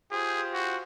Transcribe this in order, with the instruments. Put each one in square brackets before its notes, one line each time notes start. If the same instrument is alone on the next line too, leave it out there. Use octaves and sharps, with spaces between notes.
[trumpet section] F4 G4 C5 [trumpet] G#4
[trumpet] F#4